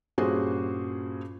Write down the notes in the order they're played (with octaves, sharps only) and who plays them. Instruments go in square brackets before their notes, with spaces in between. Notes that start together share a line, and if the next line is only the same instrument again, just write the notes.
[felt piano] G2 A#2 C#4 F#4 G#4 C5